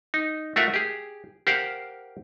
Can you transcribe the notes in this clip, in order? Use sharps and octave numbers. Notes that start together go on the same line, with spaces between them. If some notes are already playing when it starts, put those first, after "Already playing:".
D#4
A3 F4 F#4 A#4 E5 F#5
G4 G#4
G4 A#4 C5 F5 F#5